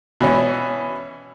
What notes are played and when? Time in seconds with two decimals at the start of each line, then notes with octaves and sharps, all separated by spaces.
0.21 B2 E3 C#4